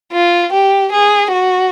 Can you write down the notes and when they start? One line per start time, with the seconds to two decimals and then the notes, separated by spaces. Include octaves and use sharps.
0.12 F4
0.52 G4
0.92 G#4
1.32 F#4